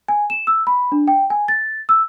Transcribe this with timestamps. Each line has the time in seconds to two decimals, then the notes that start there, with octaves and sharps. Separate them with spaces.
0.08 G#5
0.30 E7
0.47 E6
0.67 B5
0.92 D4
1.08 G5
1.30 G#5
1.48 A6
1.89 E6